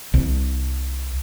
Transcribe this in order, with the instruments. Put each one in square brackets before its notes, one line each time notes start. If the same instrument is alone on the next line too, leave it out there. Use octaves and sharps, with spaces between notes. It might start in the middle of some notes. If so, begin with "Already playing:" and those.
[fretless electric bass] C2